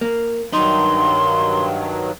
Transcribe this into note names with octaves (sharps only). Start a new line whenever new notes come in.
A#3
G2 D#3 F#3 D#4 C6